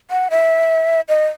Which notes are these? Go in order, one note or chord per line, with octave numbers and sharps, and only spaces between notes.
F#5
E5
D#5